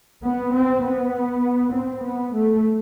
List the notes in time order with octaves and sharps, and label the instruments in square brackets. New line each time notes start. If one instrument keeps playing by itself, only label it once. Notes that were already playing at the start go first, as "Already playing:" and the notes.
[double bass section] B3
C4
B3
C4
B3
A3